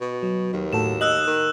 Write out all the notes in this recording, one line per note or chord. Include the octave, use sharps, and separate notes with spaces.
B2
F#3
D#2
A2 F#4 A4 E7
D#5 E6 F#6 F#7
D#3